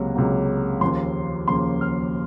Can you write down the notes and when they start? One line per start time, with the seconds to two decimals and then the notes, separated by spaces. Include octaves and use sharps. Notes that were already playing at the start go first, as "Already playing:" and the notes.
Already playing: C#2 C3 F#3 A#3
0.15 C#2 C3 F#3 A#3
0.81 D#2 C#3 F3 A#3 C6
1.48 D#2 C#3 F3 A#3 C6
1.81 F6